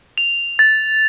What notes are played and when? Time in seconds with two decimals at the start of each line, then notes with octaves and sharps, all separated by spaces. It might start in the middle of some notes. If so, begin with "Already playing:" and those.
0.18 F7
0.59 A6